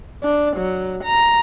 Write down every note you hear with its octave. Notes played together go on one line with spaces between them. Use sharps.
D4
F#3
A#5